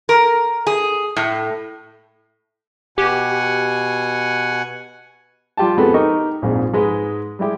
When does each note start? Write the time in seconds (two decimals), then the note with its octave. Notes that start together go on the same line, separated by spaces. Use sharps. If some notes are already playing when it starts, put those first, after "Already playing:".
0.09 A#4
0.67 G#4
1.16 A2
2.98 B2 G4 F#5 G#5
5.57 G3 F4 G4 G5 A5
5.77 F2 G#3 B3 A4
5.94 D#4 G4 A#4 D#5 C#6
6.42 A#1 F2 G#2 G#3
6.74 G#2 G#3 B4
7.39 G3 G#3 E4 G4